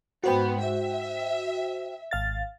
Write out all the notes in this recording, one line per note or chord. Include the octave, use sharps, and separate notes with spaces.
G#2 B3 F#4 C5 G5
E5
G#1 F5 A6